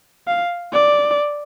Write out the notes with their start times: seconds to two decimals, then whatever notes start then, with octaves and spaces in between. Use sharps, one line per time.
0.27 F5
0.73 D5